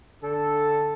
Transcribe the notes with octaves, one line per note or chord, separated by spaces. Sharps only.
D3 A4